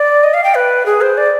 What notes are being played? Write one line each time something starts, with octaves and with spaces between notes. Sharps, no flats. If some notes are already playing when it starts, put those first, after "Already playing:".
Already playing: D5
D#5
F5
G5
B4
G#4
C5
D5